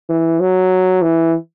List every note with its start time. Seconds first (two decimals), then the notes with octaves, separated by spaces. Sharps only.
0.09 E3
0.40 F#3
1.02 E3